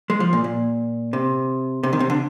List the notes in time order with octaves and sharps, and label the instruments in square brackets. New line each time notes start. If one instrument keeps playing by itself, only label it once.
[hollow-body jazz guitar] G#3
F3
A#2
A#2
C3
C3
D#3
C3
D3